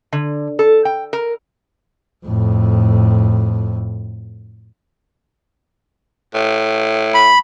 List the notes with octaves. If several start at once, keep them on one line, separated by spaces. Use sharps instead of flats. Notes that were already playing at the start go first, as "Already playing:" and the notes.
D3
A4
G5
A#4
F2 A2
A2
B5